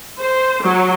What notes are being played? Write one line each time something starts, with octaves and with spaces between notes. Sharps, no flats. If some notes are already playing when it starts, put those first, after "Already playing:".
C5
F#3